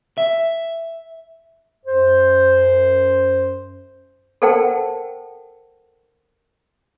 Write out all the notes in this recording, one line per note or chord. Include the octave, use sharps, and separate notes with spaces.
E5
F#2 C5
A4 A#4 C5 F#5 G5 A5